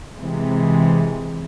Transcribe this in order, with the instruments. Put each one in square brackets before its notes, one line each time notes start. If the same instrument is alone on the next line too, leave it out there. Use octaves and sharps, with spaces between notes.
[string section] C3 E3 G#3